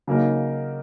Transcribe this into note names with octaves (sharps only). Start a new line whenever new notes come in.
C#3 F#3 A#3 D#4 A#4